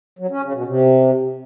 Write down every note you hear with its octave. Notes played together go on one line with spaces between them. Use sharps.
F#3
C#4
C#3
B2
C3